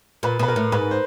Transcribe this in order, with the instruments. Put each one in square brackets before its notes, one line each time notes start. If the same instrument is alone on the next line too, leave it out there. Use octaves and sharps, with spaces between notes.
[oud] A#2 [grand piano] B4
[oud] B2 [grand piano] B4
[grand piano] A#4
[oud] A2
[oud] G#2 [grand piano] B4
[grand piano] C5